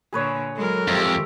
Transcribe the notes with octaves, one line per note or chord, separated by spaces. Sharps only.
A#2 D3 G#4 B4 C#5
F#3 G#3 A4 A#4
F2 G#3 G4 C5 E5